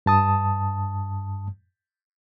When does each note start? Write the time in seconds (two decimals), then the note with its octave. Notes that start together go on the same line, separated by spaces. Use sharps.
0.06 G2 A5 D#6